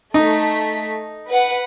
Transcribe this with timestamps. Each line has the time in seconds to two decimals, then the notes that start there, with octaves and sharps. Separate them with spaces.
0.14 A3 D#4 B6
1.30 B4 F#5